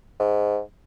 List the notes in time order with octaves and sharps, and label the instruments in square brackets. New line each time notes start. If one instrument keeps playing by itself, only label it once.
[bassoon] G#2